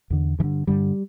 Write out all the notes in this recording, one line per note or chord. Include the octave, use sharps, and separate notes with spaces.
E2 D3
G2 E3
D3
G2 D3 G3